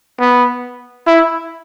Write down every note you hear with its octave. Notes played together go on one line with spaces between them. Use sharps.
B3
E4